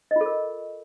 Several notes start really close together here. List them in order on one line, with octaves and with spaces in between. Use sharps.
D#5 F4 A4 A#4